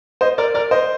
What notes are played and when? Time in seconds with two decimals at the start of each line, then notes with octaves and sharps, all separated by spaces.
0.21 C5 D#5
0.38 A#4 D5
0.54 A#4 D5
0.71 C5 D#5